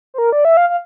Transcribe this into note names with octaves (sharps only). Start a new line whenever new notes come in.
C5
A#4
D5
E5
F5
F5